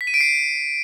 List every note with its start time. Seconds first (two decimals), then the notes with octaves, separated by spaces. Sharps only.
0.01 B6
0.07 D#7
0.14 D7
0.21 C7